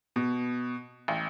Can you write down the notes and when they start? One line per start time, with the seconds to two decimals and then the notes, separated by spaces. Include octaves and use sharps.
0.16 B2
1.08 A1